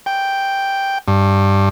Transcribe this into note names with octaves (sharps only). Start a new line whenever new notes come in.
G5
G2